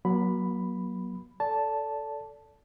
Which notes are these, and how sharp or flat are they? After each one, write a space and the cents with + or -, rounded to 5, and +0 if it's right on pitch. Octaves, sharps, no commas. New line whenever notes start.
F#3 +0 A#3 +45 B5 +0
A4 +0 D5 -25 A5 +0